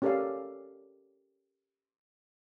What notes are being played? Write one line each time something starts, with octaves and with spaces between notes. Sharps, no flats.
C#4 G4 A4 A#4 D5 F5